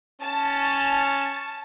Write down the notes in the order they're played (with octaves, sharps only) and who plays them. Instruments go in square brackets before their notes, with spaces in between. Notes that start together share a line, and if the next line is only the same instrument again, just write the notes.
[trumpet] C#4 [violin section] A5